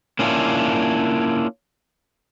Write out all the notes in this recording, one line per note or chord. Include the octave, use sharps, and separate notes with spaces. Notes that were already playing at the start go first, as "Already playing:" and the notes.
A#3 C#4 D4 E4 F4